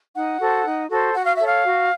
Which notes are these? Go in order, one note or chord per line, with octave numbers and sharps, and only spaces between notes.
D#4 F#5
F#4 A4 C5
D#4
F#4 A4 C5
F#4 F#5
F5
A4 C#5 E5
F5
F#4